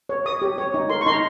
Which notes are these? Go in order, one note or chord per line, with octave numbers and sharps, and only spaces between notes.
C#5
C#5 D#6
G4
C#5
D#4
A#4 C6
C#6
D#4 C6
A#5